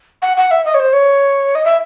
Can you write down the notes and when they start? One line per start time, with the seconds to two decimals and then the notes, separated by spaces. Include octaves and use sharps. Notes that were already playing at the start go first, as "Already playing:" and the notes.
0.22 F#5
0.37 F#5
0.51 E5
0.65 D#5
0.74 C#5
0.80 C5
0.93 C#5
1.55 D#5
1.65 E5